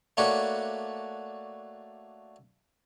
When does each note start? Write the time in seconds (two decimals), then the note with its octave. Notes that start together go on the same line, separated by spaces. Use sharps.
0.17 A3 A#3 D4 F#4 B4 C#5